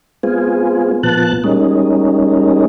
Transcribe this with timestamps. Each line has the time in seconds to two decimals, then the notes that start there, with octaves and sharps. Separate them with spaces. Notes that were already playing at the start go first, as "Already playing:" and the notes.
0.23 G#3 B3 C4 F4 G#4
1.03 A#2 F3 B3 A5 F#6
1.44 G3 G#3 A#3 C#4 D#4